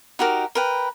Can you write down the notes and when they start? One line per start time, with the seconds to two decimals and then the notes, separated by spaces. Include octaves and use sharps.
0.19 D#4 F#4 G4 A#4
0.55 A#4 B4 G5